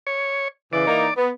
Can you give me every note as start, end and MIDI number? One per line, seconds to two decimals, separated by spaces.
0.07 0.48 73
0.73 0.86 49
0.73 0.86 52
0.73 1.14 74
0.87 1.06 52
0.87 1.06 58
0.87 1.06 63
1.17 1.29 59